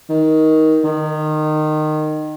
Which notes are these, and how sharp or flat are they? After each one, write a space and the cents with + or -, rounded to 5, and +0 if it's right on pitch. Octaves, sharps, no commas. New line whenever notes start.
D#3 +15
D#3 -20